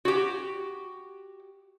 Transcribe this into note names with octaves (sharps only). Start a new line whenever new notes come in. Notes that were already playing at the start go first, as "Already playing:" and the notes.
F#4 G4